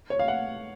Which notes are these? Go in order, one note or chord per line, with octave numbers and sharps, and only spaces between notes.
C#5
F5
F#5